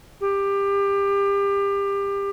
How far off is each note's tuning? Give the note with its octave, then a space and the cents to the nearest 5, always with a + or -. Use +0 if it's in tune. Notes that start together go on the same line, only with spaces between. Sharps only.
G4 +25